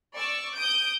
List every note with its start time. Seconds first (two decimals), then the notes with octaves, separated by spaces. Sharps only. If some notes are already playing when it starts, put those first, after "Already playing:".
0.15 D5 C#6 E6
0.55 D#6 G6 D7